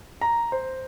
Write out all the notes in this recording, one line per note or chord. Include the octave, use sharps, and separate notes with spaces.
A#5
C5